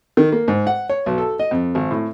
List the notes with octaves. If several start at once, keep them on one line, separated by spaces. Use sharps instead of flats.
D#3
A#3
G#2
F#5
C#5
B1
A4
D#5
F2
G#1
A2